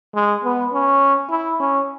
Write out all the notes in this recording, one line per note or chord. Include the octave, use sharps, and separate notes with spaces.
G#3
B3
C#4
E4
C#4